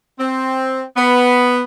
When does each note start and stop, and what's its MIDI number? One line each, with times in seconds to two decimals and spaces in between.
0.19 0.82 60
0.97 1.61 59